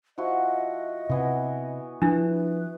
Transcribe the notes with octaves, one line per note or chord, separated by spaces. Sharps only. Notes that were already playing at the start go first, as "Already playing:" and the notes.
F3 E4 F#4 D#5
C3 E3 B3 G#5
F3 D4 E4 B4